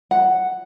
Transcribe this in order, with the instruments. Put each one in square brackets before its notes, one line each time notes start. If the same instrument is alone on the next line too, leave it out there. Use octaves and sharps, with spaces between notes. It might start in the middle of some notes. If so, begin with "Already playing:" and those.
[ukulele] F#5